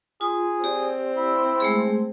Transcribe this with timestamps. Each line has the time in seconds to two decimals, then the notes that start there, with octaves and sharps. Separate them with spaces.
0.21 F4 G#4 C6
0.64 C4 G4 D5
1.17 E4
1.60 G#3 A3 G#4